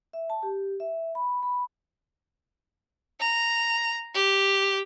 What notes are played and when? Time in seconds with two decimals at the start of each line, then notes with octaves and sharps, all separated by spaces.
0.13 E5
0.30 A5
0.43 G4
0.80 E5
1.15 B5
1.43 B5
3.20 A#5
4.14 G4